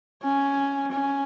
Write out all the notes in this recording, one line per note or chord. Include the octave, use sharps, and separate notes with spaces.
C#4
C#4